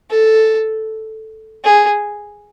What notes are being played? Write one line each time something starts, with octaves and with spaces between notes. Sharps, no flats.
A4
G#4